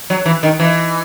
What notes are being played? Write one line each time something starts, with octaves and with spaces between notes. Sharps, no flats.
F#3
E3
D#3
E3